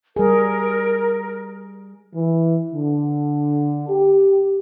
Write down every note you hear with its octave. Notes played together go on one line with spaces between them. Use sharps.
G3 G#4 A#4
E3
D3
G4